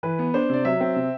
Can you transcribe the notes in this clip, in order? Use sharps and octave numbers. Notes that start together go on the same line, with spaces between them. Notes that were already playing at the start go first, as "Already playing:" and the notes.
E3 B4
B3
D4 C5
C3 D5
F#3 E5
C4
C3